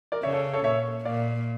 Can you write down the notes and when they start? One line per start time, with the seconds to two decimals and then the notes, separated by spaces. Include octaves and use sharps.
0.12 A#4 D5
0.23 C#3 C#5 E5
0.33 A4 C#5
0.53 A4 C#5
0.64 A#2 C#5 E5
1.05 A#2 D5 F5